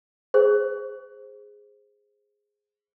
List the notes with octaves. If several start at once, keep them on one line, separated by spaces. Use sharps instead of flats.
G#4 C5